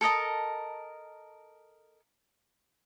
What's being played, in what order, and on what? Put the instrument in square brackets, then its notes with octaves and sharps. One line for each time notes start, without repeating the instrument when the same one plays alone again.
[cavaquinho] A4 A#4 D#5 A5